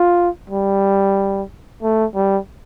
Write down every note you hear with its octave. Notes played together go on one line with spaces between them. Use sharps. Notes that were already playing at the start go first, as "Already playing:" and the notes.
Already playing: F4
G3
A3
G3